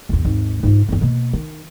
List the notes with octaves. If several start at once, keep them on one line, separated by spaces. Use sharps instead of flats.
A1 E2
G#1 D#2
G#2 F4
G1 E2
B2 A#3
D#3